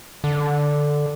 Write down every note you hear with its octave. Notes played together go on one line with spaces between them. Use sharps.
D3